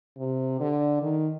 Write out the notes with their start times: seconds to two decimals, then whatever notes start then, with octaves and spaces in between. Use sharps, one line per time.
0.18 C3
0.60 D3
1.02 D#3